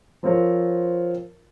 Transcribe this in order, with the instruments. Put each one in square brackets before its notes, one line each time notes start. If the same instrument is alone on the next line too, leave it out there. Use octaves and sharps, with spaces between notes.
[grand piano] F3 C4 F4 A#4 C#5